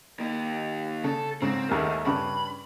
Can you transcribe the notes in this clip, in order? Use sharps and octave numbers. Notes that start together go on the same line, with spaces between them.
D#3 A#3
C#3 A4
G#2 C#3 C4
D#2 G#2 A3 A#4
G2 C#3 B5 C#6